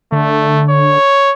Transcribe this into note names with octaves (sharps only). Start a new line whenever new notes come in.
D3 A3
C#5